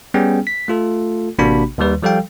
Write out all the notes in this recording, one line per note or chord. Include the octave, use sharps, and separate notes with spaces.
G3 B3 C#4 G#4 G5
B6
A3 F4 A4
A1 C3 A#3 D4 F#4 B5
D#2 D#3 G3 B4
F3 G3 A4 F5 G5